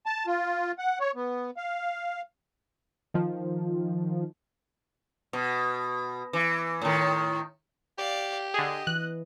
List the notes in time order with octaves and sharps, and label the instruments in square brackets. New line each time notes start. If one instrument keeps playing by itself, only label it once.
[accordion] A5
F4
F#5
C#5
B3
F5
[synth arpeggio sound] D#3 F3
[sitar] B2
E3
A2 D#3
[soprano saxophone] G4 [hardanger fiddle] D5 F5
[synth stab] D3 G#4 [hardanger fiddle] D#5
[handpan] E3 [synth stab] F#6